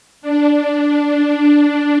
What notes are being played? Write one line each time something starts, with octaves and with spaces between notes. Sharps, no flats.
D4